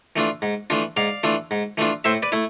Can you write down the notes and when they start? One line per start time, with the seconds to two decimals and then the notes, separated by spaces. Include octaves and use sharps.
0.16 E3 A3 D4 F4
0.42 G#2
0.70 E3 A3 D4 F4
0.97 G#2 D5 F5
1.23 E3 A3 D4 F4
1.51 G#2
1.77 E3 A3 D4 F4
2.04 A2 C5 E5
2.22 B4 D5
2.32 A3 E4